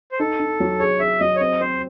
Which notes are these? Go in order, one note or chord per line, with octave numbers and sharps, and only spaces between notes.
C5
D#4 A4
D#4
F#3
G#4 C#5
G#4 E5
F#3 D#5
C#5
C4 D#5
C4 C5